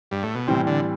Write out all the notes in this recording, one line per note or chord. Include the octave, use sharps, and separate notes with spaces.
G2
A2
B2
A2 C3 E3 G3 C4
D3